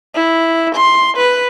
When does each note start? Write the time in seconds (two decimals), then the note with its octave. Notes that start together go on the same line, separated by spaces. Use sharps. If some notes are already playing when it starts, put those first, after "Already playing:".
0.15 E4
0.75 C6
1.17 B4